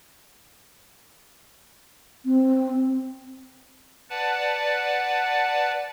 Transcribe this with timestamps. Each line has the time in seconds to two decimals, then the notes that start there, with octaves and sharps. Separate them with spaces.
2.25 C4
4.10 B4 D5 F#5 A5